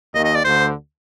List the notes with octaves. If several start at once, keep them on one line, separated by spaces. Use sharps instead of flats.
D#2 D#3 D#5
D#5
D5
D2 D3 C5